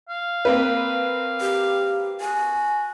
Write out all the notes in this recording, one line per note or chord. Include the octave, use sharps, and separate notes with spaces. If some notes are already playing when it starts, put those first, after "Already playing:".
F5
A#3 C4 B4
G4
F#4 G#5